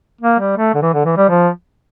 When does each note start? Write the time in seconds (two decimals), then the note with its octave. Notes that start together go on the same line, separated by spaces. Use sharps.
0.21 A#3
0.39 G3
0.57 A3
0.74 D3
0.82 E3
0.94 D3
1.05 E3
1.17 G3
1.30 F3